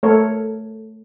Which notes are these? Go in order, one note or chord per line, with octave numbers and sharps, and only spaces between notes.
A3 A4 A#4 C#5